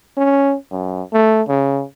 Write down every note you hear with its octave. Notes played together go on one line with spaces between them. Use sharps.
C#4
F#2
A3
C#3